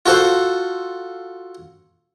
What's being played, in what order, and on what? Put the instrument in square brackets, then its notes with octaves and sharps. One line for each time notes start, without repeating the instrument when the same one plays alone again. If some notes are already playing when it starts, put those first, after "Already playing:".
[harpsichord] F4 F#4 A4 C5